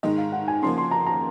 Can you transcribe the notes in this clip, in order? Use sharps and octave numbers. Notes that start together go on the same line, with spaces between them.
G#2 D#3 G#3 D#5
F5
F#5
G#5
C#3 F3 A#3 C6
C6
A#5
A#5